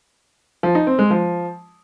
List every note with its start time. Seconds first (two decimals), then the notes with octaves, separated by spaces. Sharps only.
0.63 F3
0.75 D#4
0.87 C4
0.99 G#3
1.10 F3